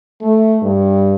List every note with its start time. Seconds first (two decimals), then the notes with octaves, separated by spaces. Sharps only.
0.21 A3
0.63 G2